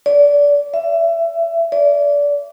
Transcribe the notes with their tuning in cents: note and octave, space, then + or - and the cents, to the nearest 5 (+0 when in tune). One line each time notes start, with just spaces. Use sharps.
D5 -25
E5 +25
D5 -25